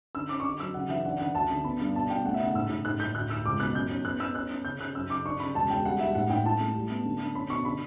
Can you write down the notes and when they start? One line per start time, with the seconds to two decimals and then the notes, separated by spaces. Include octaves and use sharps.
0.15 D3 E6
0.29 C#4 D6
0.40 C#6
0.44 D3 D6
0.60 F#3 E6
0.74 C#3 F#5
0.89 E3 E5
1.05 D4 F#5
1.20 D3 F#5
1.35 D2 A5
1.50 D3
1.64 B3 B5
1.80 G2
1.95 B2 A5
2.10 B2 G5
2.25 A3 F#5
2.34 E5
2.40 C#3 F#5
2.54 A2 E6
2.69 A2
2.85 A2 F#6
2.99 A2 G6
3.15 D2 F#6
3.30 D2 E6
3.45 C#2 D6
3.60 B2 F#6
3.75 F#2 G6
3.90 C#4
4.05 B3 F#6
4.20 B3 E6
4.35 C#4 F#6
4.50 C#4
4.65 C#3 G6
4.80 C#3 F#6
4.95 F#2 E6
5.10 C#3 D6
5.24 D4 C#6
5.40 C#3 B5
5.55 E1 A5
5.70 E1 G5
5.85 G3 F#5
5.99 G3 E5
6.15 A2 F#5
6.30 A2 G5
6.46 E4 A5
6.60 A3
6.75 G3
6.90 B3
7.05 D3
7.20 D3
7.35 C#4 B5
7.50 B2 C#6
7.65 D3 B5